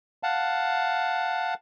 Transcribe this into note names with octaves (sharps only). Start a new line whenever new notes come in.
F5 F#5 A5